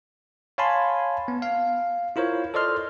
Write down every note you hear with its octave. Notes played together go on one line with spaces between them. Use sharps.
C#5 F5 G#5 A5 B5 C6
B3
F5
E4 F4 A#4 C5 C#5
A4 C5 D5 D#5 C6 F6